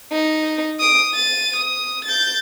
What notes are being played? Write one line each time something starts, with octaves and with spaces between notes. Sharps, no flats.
D#4
D#6 D7
A6 D#7
D#6
G6 A6